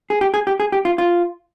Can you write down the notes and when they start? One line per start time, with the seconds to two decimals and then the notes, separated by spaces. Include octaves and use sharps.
0.10 G#4
0.21 G4
0.34 G#4
0.47 G4
0.60 G#4
0.72 G4
0.85 F4
0.98 F4